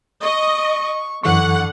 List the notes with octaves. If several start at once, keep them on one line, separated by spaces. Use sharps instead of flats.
D#5 C#6
F#2 D3 E3 F#5 C#6